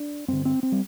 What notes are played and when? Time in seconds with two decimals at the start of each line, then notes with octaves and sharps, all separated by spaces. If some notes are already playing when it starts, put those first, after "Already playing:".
Already playing: D4
0.28 G2 D3 C4
0.45 C4
0.63 C4
0.72 G3